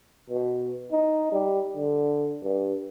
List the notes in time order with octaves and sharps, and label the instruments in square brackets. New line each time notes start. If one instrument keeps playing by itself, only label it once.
[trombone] B2
D#4
G3
D3
G2